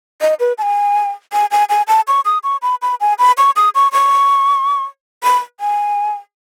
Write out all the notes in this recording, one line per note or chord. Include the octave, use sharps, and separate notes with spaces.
D#5
B4
A5
G#5
G#5
G#5
G#5
A5
C#6
D#6
C#6
B5
B5
G#5
B5
C#6
D#6
C#6
C#6
B5
G#5